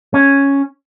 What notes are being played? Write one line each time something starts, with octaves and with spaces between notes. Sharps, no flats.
C#4